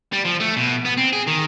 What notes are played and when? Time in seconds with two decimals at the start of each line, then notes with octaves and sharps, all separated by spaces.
0.13 G3
0.25 F3
0.41 A3
0.57 B2
0.85 B3
0.97 C4
1.13 G#4
1.27 D#3